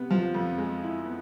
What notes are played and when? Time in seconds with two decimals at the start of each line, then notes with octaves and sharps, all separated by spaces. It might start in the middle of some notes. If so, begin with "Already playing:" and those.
Already playing: C3 B3
0.10 F3
0.34 F2
0.58 G#3
0.82 E4
1.05 B3